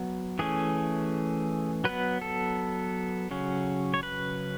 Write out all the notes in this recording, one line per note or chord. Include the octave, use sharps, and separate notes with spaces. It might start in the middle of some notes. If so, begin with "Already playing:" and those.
Already playing: F#3 B3
E3 A3 C#4 G#4
F#3 B3 B4
A4
C#3 F#3 C#4
C#5
B4